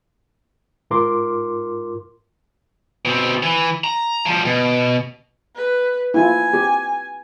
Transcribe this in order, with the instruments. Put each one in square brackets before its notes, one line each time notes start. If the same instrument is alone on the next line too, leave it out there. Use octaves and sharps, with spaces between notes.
[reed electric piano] G#2 F4 A#4 C6 D6
[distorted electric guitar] B2 C4
E3
A#5
F3 G3
B2
[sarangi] B4
[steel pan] E4 F4 [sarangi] G#5
[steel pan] G4